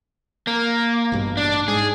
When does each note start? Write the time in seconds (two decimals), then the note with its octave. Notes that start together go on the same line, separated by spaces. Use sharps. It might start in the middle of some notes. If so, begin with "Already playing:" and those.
0.47 A#3
1.12 A1 G2 B2
1.37 D4
1.68 G#2 G#4